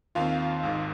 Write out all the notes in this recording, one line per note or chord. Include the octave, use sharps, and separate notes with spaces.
D#2 D#3 C4 F4 F5
G#1 G#2 D#3